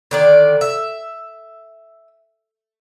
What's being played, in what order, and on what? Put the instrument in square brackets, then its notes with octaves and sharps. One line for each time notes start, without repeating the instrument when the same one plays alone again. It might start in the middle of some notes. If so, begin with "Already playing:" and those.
[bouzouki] D3 D#3 D5
E5